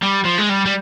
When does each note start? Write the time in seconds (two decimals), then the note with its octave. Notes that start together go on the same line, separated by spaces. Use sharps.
0.03 G3
0.25 F3
0.38 G#3
0.49 G3
0.66 G3